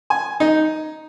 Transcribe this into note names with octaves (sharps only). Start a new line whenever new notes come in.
G#5
D#4